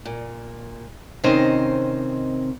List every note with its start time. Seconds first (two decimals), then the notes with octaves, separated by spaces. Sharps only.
0.06 A#2
1.24 C3 D#3 C4 C#4 C5 D#5